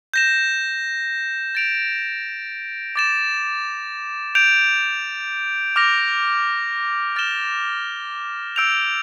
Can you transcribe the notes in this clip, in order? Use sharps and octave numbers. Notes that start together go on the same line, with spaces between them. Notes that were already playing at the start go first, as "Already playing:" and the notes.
G6 A#6 E7
A6 D7 F7
D6 A6 E7
G6 D7 F7
D6 F6 A#6 F7
F6 A6 E7 G7
E6 G6 D7 F7